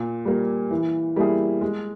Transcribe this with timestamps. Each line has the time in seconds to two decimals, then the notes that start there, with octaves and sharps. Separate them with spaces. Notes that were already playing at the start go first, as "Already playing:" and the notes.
Already playing: A#2
0.25 G3 A#3
0.71 E3
1.16 G3 A#3 E4 G#4
1.61 G#3